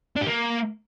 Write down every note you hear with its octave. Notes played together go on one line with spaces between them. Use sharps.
D4
G4
A#3